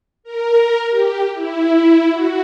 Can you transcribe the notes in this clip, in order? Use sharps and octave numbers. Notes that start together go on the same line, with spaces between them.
A#4
G4
E4
F#4